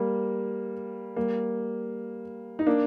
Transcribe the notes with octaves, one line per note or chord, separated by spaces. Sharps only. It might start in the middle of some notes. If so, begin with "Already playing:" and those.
Already playing: G3 A#3
G3 A#3
D#4
A#3 D4